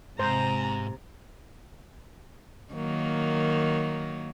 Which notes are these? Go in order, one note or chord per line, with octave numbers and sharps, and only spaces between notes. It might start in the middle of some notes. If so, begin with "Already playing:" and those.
G#2 C3 C5 A#5
D#3 F#3 A#3